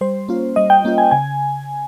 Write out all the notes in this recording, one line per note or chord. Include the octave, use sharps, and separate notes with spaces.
G3 C5
A#3 C#4 F4
G3 D#5
G5
A#3 C#4 F4
G#5
C#3 G#5